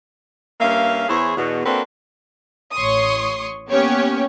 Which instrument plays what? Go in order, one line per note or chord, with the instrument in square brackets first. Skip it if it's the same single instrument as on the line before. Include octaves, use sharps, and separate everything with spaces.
[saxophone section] G2 A#3 C#4 E5 F5
E2 E3 E4 G#4 C5 C#5
E2 B2
A#3 C4 D4 F#4 A4 B4
[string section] A1 C#5 C6 C#6 D#6
A#3 B3 C#4 G4 C#5